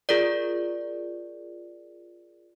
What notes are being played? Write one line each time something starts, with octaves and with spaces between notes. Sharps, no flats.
F4 G#4 A#4 D5